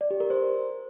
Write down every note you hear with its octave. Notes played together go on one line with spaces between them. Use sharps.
D5
G4
A#4
C5